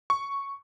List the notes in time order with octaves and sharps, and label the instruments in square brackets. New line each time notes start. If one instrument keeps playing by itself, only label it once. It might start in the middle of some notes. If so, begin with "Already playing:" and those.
[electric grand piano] C#6